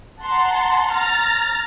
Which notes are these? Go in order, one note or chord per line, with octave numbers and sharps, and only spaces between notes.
F#5 A5 A#5 C6
A#5 F6 A6 A#6